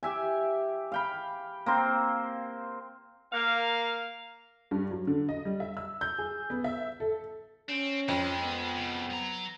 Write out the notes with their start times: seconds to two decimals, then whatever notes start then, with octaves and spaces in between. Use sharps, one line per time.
0.03 G4 E5 G#5
0.92 F5 G5 B5
1.66 A#3 C4 C5
3.32 A#3 F5
4.71 G2
4.91 F#3
5.07 D3
5.29 D#5
5.45 G3
5.60 E5
5.77 E6
6.01 G6
6.18 G#4
6.50 B3
6.64 E5
7.00 A4
7.69 C4 C#4
8.08 F2 G#3
8.43 B3
8.76 C2 C#3
9.10 F#3 A#5